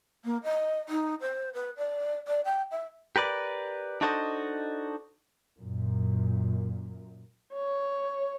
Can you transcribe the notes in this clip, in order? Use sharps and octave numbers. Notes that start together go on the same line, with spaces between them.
A#3
D#5
D#4
C5
B4
D5
D5
G5
E5
G4 A#4 B4 D5
D4 D#4 F#4 A4 C5 D#5
F#2 A#2
C#5